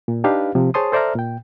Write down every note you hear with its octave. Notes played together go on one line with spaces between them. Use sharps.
A#2
D4 D#4 G4 B4 F5
C3 F3
G#4 C5 C#5 A5 C6 D#6
A4 C5 D5 E5 A#5 F6
A#2 G5